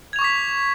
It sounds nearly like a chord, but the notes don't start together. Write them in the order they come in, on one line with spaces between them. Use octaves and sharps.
G#6 F7 C#6 D6 B6